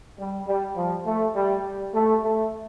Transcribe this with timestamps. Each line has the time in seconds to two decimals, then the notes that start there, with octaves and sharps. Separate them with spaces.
0.19 G3
0.47 G3
0.77 F3
1.06 A3
1.36 G3
1.94 A3
2.23 A3